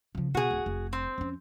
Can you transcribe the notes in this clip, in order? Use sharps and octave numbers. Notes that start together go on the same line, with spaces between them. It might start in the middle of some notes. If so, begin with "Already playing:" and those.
C#3 F3
B2 F#4 G#4
D1
F1
C4
F2 C#4